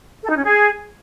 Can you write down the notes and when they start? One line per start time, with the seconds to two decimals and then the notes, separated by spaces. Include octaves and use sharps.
0.23 A4
0.30 D#4
0.37 C#4
0.44 G#4